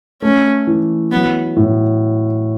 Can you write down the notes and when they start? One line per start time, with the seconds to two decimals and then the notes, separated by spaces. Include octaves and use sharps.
0.22 A3 C#4
0.67 E3
1.12 F#3 B3
1.57 A2